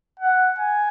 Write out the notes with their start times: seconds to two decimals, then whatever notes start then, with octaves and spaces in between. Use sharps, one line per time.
0.20 F#5
0.58 G#5